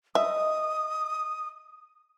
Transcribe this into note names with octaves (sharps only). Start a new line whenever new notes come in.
D#5 E5 D#6